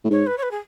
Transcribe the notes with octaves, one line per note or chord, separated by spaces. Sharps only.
A2
G#2 C#5
B4
C#5
B4
G#4